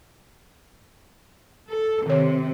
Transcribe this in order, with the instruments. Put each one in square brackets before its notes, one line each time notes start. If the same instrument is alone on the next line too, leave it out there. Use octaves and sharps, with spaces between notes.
[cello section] A4
[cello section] C3 [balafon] D#3 C#5